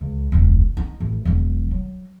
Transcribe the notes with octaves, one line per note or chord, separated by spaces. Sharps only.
C#2
E1 C#2
D#4
A1
E1 F#3
F#3